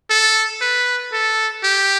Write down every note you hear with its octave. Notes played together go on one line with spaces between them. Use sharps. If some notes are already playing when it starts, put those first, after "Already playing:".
A4
B4
A4
G4